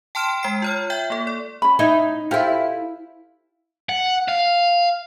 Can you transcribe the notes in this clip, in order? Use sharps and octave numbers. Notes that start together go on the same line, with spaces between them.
G5 A5 C6 F6 D7 E7
G#3 G5 C7
F4 C#5 F6
E5 G5 G6
A#3 A4
D5
C#4 B5
D#4 E4 D#5
E4 F4 G4 A4 C5
F#5
F5